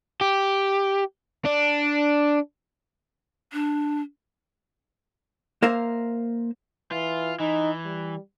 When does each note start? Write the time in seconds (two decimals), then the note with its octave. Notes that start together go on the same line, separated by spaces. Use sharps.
0.21 G4
1.46 D4
3.53 D4
5.62 A#3 A#4 C5 E5 F5
6.92 E3 F4
7.40 E3 D#4
7.85 G3